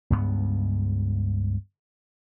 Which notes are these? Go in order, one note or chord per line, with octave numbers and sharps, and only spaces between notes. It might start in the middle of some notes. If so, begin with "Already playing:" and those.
C#2 G2 B3